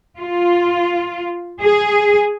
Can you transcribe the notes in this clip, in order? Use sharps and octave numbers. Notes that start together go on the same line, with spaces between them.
F4
G#4